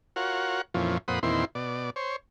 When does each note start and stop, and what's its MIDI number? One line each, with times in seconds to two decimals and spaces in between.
0.16 0.61 65
0.16 0.61 66
0.16 0.61 70
0.16 0.61 73
0.16 0.61 78
0.74 0.98 41
0.74 0.98 46
0.74 0.98 52
0.74 0.98 53
0.74 0.98 61
1.08 1.19 41
1.08 1.19 46
1.08 1.19 72
1.08 1.19 78
1.08 1.19 83
1.08 1.19 87
1.23 1.45 40
1.23 1.45 46
1.23 1.45 51
1.23 1.45 60
1.23 1.45 64
1.23 1.45 84
1.55 1.90 47
1.55 1.90 74
1.96 2.16 72
1.96 2.16 73